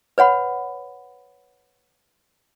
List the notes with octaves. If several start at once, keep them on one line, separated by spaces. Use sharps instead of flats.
B4 C#5 F#5 B5